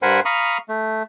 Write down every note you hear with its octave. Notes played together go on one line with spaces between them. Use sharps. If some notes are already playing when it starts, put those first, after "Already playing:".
G2 A#4 C5 F#5 G#5 B5
F5 A#5 B5 C#6 D#6
A3